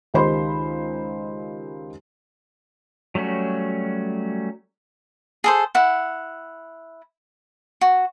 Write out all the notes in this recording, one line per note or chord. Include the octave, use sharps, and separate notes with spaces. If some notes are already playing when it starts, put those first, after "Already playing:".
C#2 D#3 G4 C5 B5 C6
F#3 G3 A3 C#4 F#4
G#4 A4 C5
E4 F#5
F#4